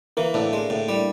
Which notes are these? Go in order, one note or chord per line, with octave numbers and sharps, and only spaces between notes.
E3 A#3
A2 D4 E4
G#3
A2
G3